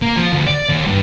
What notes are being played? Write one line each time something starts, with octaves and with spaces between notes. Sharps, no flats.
A#3
F3
D2
D5
D#2
G2